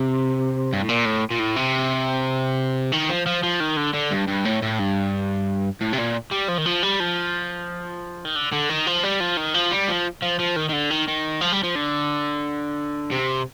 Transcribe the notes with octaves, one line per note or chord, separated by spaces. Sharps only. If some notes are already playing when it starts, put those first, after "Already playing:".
Already playing: C3
G2
A2
A#2
A2
A#2
A2
C3
D#3
F3
F3
F3
D#3
D3
D3
G2
G2
A2
A2
G2
A2
C3
A#2
G3
F3
D#3
F3
G3
F3
D#3
D3
D3
D#3
F3
G3
F3
D#3
F3
G3
F3
F3
F3
D#3
D#3
D3
D#3
D#3
F3
G3
F3
D3
C3